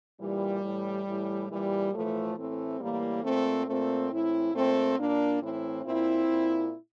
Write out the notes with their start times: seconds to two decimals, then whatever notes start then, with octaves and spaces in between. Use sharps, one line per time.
0.20 A#2 E3 G3
0.63 A2 E3
1.07 A2 E3
1.49 A#2 E3 G3
1.93 A2 E3 F3 A3
2.36 A2 E3 A3 C4
2.80 A2 E3 G3 A#3
3.24 A#2 A3 C4
3.67 A#2 A3 C4
4.11 A2 E3 C4 E4
4.54 A#2 A3 C4
4.97 A#2 A#3 D4
5.40 A2 E3 C4 E4
5.84 A#2 C4 E4
6.28 A#2